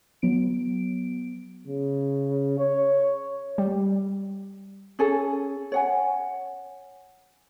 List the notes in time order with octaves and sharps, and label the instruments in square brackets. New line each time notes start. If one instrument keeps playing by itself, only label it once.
[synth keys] F#3 B3 D7
[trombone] C#3
C#5
[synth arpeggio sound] G3
[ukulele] C#4 G#4 A4
C#5 F#5 G#5